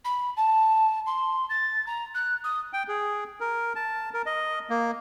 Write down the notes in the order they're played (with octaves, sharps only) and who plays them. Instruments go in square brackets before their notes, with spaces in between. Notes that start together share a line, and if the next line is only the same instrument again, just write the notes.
[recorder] B5
A5
C6
A6
A#5
F#6
D#6
[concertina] G5
G#4
A#4
A5
A#4
D#5
A#3